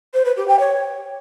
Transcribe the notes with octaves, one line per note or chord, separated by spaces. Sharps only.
C5
B4
G4
G5
C#5